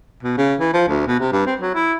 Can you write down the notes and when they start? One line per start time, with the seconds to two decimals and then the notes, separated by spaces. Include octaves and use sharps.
0.23 B2
0.38 C#3
0.60 E3
0.73 F3
0.88 D2
1.06 B2
1.20 C3
1.32 G2
1.46 C4
1.61 F#3
1.75 E4